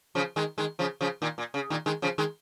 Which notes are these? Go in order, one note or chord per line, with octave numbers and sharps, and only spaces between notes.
C#3 F3
D#3 G#3
D#3 G#3
C#3 F3
C#3 F3
A#2 D#3
A#2
C#3
A#2 D#3
D#3 G#3
C#3 F3
D#3 G#3